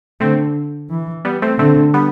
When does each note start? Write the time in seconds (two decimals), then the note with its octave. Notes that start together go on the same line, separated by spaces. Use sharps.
0.20 D3 A3 C4
0.90 E3
1.25 G3 B3
1.42 A3 C4
1.59 D3 A3 C4
1.94 G3 B3